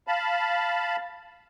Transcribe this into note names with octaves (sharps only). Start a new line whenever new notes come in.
F5 A5 B5